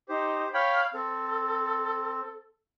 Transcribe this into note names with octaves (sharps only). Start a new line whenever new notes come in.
D#4 G4 C5
C#5 F5 G5 B5
C4 A4